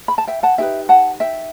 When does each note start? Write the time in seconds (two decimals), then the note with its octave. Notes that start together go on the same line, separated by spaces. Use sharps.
0.08 B5
0.18 A5
0.27 E5 G5
0.43 F#5 A5
0.58 D#4 G4 B4 E5 G5
0.89 F#5 A5
1.20 E5 G5